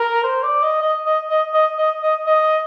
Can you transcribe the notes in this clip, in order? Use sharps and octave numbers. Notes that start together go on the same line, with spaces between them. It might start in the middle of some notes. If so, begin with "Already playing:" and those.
Already playing: A#4
C5
D5
D#5
D#5
D#5
D#5
D#5
D#5
D#5
D#5